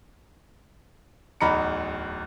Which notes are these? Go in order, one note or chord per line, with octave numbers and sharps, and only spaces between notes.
D1 E2 D#4 A#5 B5 C#7